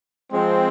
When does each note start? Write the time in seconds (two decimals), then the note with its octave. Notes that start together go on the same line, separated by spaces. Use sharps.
0.31 F3 G#3 C4